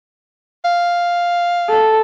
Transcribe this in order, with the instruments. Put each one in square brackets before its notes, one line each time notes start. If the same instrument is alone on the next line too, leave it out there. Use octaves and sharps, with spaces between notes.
[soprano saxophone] F5
[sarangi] A4